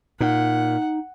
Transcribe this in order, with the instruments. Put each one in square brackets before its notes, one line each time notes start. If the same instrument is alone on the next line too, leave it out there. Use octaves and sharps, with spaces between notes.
[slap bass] A#2 [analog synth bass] D#4 [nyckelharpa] F#5